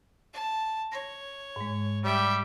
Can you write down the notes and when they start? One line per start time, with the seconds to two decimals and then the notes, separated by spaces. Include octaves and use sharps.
0.33 A5
0.92 C#5 A#6
1.56 G#2 G#3
2.04 G3 E5 G5